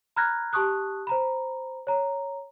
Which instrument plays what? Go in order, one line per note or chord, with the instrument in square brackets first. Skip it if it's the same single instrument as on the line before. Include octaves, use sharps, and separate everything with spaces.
[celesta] A#5 B5 F6 F#6 G#6 A#6
G4 A5 C#6 D#6 F#6
C5 A#5 B5
C#5 A#5